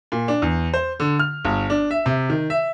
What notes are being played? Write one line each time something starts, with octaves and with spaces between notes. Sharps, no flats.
A#2
D4
E2
C5
D3
F6
G1
D4
E5
C3
D#3
E5